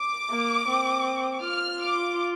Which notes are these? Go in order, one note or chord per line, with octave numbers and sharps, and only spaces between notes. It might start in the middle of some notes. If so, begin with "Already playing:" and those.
Already playing: D6
A#3
C4
F4 F6
D6